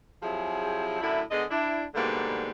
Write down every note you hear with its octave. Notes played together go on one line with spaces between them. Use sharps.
C3 F3 F#3 E4 G#4
F#2 A2 D3 E4
D3 G#3 B3 G#4 D#5
D4 E4
G#2 B2 D3 G3 A3 A#3